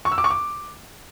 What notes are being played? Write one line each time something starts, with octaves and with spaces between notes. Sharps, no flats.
C#6
E6
D6
C#6
D6